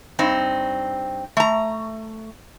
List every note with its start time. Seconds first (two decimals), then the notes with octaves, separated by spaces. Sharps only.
0.19 G2 C4 D#4
1.37 A3 A#5